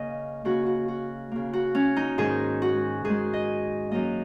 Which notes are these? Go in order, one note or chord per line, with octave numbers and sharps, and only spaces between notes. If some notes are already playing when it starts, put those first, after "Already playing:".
Already playing: C#3 A#3 D#5
C#3 A#3 F#4
F#4
F#4
C#3 A#3
F#4
C#4
D#4
G#2 D#3 G#3 G#4
F#4
G#2 D#3 G#3 G#4
D#5
F#2 F#3 A#3 D#5